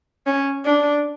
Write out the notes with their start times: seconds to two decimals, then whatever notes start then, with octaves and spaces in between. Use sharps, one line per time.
0.26 C#4
0.65 D4